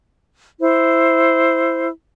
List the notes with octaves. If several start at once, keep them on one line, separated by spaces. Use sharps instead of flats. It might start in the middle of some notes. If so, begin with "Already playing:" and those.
E4 C5